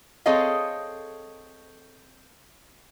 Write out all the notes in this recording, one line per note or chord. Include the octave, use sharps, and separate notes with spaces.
C4 G#4 A4 C#5 D#5 F5